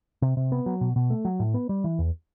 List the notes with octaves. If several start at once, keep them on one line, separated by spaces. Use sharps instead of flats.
C3
C3
B3
F#3
B2
B2
A3
F#3
A2
B3
G3
E3
E2